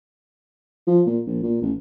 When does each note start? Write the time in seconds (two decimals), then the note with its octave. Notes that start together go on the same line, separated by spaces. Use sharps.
0.87 F3
1.06 A#2
1.27 A#1
1.42 A#2
1.62 A1